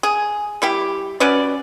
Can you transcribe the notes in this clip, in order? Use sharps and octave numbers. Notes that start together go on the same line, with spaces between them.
G#4
G3 E4 G4
F#3 C#4 B4 D5